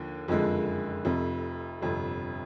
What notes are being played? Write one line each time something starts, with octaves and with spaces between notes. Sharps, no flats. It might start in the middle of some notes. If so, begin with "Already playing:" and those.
Already playing: D#2 D3 F3
F#1 F2 D3 F3 G#3
F1 F2 C3
G1 F2 C3